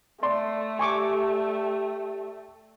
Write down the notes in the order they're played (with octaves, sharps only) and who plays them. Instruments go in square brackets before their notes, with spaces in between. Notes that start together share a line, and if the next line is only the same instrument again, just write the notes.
[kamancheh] A3 [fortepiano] D5 C6
[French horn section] G4 [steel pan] G#5 C#6 D6